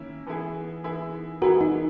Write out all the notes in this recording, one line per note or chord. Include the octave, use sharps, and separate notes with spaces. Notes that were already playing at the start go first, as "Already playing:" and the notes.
Already playing: D#3 A#3 C#4 E4
E3 B3 E4 G#4
E3 B3 E4 G#4
E3 B3 E4 F#4 G#4 A#4
D#4